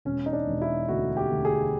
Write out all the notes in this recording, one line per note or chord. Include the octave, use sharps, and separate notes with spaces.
E1 C#4
D#4
D4
E1
E4
D2 F#4
G4
D2
G#4